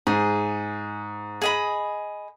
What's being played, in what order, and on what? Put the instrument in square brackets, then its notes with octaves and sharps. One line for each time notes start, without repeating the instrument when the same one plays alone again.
[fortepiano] G#2 [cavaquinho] G#4
[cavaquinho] G#4 D#5 B5